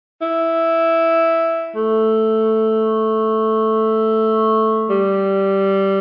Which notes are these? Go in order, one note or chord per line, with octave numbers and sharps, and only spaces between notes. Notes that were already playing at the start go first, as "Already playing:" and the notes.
E4
A3
G3